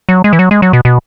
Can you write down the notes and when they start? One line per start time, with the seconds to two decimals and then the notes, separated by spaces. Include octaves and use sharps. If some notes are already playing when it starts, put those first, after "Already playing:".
0.09 F#3
0.24 G#3
0.33 E3
0.39 F#3
0.51 G#3
0.62 F#3
0.73 B2
0.85 B2